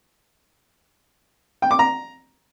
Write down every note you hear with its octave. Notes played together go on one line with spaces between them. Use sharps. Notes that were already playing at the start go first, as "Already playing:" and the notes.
G5
D6
A#5